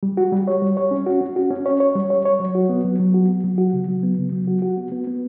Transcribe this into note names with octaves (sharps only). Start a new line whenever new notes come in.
G3
F#4
G3
C#5
G3
C#5
C#4
F#4
C#4
F#4
C#4
C#5
C#5
G3
C#5
C#5
F#3
F#4
B3
F#3
F#3
F#4
B3
F#3
F#4
C#3
F#3
B3
C#3
F#3
F#4
F#4
B3
B3
B3